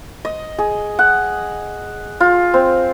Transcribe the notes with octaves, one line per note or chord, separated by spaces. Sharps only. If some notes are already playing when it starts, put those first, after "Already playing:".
D#5
G#4
F#5
F4
C4